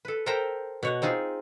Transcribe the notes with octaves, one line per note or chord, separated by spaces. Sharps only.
A4 B4
A4 A#4 C5 E5 G5 A#5
B2 C#5 F#5
C4 D#4 F4 G#4